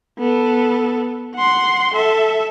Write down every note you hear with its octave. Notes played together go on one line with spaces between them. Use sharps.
B3 A4
F#5 C6
A4 E5